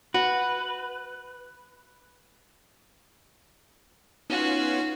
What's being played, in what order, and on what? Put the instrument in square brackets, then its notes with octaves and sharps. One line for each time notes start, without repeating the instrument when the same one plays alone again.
[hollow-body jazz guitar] F#4 [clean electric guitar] B4
[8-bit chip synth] B3 C#4 F4 [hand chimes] D#4 [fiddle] F#4